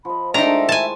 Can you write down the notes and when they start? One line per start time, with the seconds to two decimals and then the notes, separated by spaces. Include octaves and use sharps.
0.05 F3 D#5 B5
0.34 D#3 G#3 A3 D4 D#4 E5 A#5
0.69 E4 C5 G#5 A5